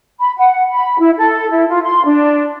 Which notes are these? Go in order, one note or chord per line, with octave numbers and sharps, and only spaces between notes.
B5
F#5
B5
E4
A4
E4
F4
C6
D4